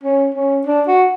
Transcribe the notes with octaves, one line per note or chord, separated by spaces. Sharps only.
C#4
C#4
D4
F#4